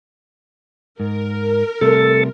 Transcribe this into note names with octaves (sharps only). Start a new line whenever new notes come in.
G#2 A#4
C3 G3 A3 A4